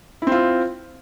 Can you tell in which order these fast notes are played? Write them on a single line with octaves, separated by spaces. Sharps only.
E4 C4 F4